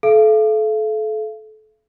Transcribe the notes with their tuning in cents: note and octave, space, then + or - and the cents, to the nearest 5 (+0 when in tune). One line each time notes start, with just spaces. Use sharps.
A4 -30 F5 -45